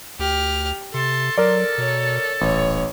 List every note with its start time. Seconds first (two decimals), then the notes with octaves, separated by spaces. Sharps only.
0.19 D2 G4 F6
0.94 C3 A4 C6
1.38 F#3 A4 A#4 D5
1.78 B2 C#5
2.41 D#1 A1 C#5